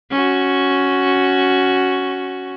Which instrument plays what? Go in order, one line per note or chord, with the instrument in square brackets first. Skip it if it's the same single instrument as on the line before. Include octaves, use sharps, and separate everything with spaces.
[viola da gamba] C#4 F#4